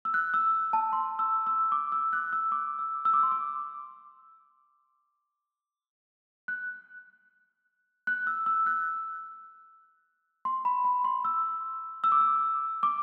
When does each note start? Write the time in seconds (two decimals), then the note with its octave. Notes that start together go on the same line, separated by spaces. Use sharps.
0.05 E6
0.14 F#6
0.34 E6
0.73 A5
0.93 C6
1.19 E6
1.47 E6
1.72 D6
1.92 E6
2.13 F#6
2.33 E6
2.52 D6
2.79 E6
3.05 E6
3.13 D6
3.23 C6
3.32 D6
6.48 F#6
8.07 F#6
8.27 E6
8.46 E6
8.66 F#6
10.45 C6
10.65 B5
10.84 B5
11.04 C6
11.25 E6
12.04 E6
12.12 D6
12.21 E6
12.83 D6